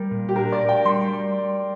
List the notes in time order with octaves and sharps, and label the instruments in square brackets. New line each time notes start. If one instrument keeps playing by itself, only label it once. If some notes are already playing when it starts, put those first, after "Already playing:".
Already playing: [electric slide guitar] G3 [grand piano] A#4
[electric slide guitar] A#2
[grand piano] G4
[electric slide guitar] D4 [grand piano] A#4
[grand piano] D5
[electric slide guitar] A#4
[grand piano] G5
[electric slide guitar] G3 [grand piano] C6